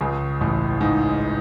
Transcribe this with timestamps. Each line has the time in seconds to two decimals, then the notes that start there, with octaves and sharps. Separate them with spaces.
0.01 C#2 C#3
0.41 A1 A2
0.81 G#2